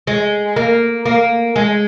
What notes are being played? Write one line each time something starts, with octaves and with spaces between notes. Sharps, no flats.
G#3
A#3
A#3
G#3